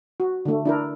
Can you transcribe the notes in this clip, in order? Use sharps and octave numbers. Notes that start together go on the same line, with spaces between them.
F#4
D3 A3
D4 E4 A#4